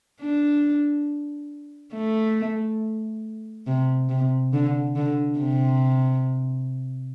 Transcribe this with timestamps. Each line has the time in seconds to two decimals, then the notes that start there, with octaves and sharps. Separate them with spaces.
0.21 D4
1.93 A3
3.67 C3
4.09 C3
4.53 D3
4.96 D3
5.39 C3